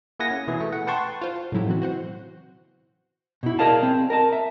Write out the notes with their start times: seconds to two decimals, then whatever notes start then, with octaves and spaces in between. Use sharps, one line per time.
0.20 A#3 E4 G#4 F#5 G#5 A#6
0.31 C#4
0.48 B2 E3 E4 G#4 B4
0.60 A3
0.72 F#5
0.87 B4 F#5 G5 A5 C6 C#6
1.21 F4 C5
1.36 A5
1.52 A2 C#3 F#3 E4 G4
1.67 B2 E3 C4 F#4
1.82 F#4 C5 F#5
3.43 B2 E4
3.59 G#4 A#4 D5 D#5 F5 A5
3.83 C4
4.10 A#4 D#5 A5
4.32 E5